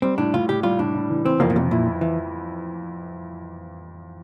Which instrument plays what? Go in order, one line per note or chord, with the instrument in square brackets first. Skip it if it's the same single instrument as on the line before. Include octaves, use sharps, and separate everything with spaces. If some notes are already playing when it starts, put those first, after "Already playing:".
[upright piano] G3 [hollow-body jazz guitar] C4
[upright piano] A2 [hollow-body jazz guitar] D4
[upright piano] A2 [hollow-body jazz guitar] F4
[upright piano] A2 [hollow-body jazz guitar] G4
[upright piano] G3 [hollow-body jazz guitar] F4
[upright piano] A2 [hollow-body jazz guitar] D4
[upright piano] A2
E3
[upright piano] E3 [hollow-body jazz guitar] C4
[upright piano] F2 [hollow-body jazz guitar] A#3
[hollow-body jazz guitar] A#2
[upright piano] F2 [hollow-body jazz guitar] C3
[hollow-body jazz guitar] A#2 [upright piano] E4
[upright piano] E4
[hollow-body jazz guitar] E3